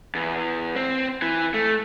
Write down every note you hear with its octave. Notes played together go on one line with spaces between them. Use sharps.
E2
C4
E3
A3